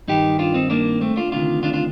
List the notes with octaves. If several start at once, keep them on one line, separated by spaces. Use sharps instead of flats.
G2 D#3 D#4 G4
D4 F4
C4 D#4
A#3 D4
A3 C4
D4 F4
D2 C3 D#3 D4 F4
D4 F4
D4 F4